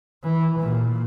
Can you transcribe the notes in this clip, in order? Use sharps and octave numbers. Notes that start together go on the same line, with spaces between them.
E3
A#2